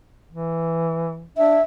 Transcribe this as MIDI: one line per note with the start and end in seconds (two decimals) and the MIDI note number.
0.32 1.26 52
1.37 1.59 62
1.37 1.63 76